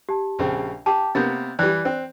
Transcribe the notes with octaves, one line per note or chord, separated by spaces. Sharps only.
G4 A5
A#1 C#3 C4
G4 A5 D6
C3 A#3 B3 G6 A6
E3 G3 D5 G5 F#6
C4